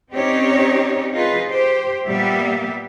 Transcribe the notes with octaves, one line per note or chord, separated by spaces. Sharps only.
C4 C#4 D#4 G4 C#5 D5
D#4 F4 G#4 B4
G4 C5
A#2 G3 A#3 B3 G4 E5